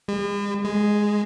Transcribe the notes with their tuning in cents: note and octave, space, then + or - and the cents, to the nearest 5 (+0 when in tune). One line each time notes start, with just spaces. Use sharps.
G#3 -45
G#3 +0